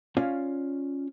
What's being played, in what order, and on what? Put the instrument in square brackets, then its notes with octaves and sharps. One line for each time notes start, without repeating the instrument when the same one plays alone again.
[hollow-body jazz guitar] C#4 F4 C#5 D5 F5